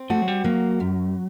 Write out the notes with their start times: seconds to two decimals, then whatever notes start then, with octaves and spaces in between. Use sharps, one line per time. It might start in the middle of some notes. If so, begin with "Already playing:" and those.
Already playing: C4
0.10 A3 F#4
0.22 F#3
0.28 G3
0.44 F#3 A#3
0.80 F#2